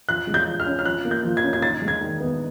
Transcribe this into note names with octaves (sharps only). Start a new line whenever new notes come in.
F3 F#6
G#3
G6
F3
F6
C#4
F6
F3 F#6
A#3
G6
F3
G#6
C#4
G#6
D#4 A6
G#3
G#6
D#3
B3